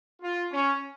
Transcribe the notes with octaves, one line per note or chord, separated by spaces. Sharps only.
F4
C#4